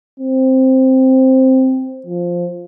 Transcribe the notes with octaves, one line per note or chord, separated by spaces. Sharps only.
C4
F3